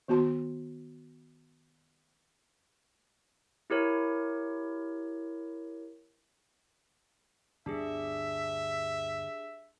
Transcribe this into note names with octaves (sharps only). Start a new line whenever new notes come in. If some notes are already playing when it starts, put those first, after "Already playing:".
D#3 B3 F#4 A5 C6
E4 G4 A#4 C#5
G1 D2 D4 G4 G#4 E5